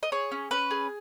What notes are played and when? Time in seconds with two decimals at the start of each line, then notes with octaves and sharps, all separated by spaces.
0.03 D#5
0.12 G#4 C#5
0.32 C#4
0.51 C#4 B4
0.71 G#4